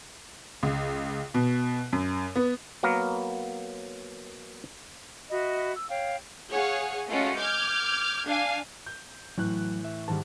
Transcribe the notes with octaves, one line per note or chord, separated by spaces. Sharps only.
C#2
B2
F#2
B3
F#3 A#3 B3 A#4
F#4 D#5 E5 B5
E6
C#5 F5 G5
G#4 C#5 F5 F#5 G#5
G#3 A3 C#4 F4 F#4
D6 F6 G6 G#6
D4 F5 G#5
G6
A2 E3 F#3 F#6
E5
G#2 D#3 E3 G3 A5